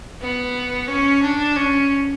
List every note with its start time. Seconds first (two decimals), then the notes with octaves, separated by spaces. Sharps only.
0.21 B3
0.88 C#4
1.22 D4
1.56 C#4